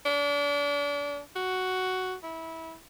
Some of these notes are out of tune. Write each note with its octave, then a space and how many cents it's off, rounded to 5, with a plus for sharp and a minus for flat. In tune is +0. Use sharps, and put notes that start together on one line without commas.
D4 -35
F#4 +5
E4 -20